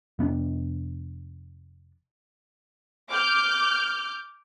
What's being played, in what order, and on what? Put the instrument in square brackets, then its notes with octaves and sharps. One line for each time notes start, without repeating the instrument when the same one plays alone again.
[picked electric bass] F1 B3 C#4 D4
[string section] D6 F6 G6